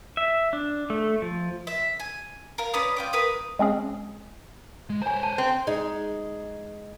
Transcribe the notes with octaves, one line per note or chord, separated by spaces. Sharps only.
E5
D4
A3
F3
E5
G#5
A#4 F5
C#4 B4 D5 D#6
F4 G5 D6
A#4 B4 D#6
G#3 C4 C#4 G#4
G#3
C5 C#5 G#5 A#5
A5
C4
G#3 D#4